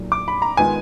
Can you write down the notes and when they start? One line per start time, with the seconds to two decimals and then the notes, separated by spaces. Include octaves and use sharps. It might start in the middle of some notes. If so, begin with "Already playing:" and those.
Already playing: B1 A#2 F#3
0.12 D6
0.28 B5
0.42 A#5
0.57 D#3 G#3 B3 F4 G#5